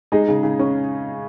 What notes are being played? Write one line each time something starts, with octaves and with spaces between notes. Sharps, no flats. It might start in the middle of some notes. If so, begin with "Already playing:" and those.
G#3 D#4 G#4
C#3
C#3
C#4